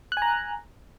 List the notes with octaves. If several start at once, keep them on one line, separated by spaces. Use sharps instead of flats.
G#5 A#5 F#6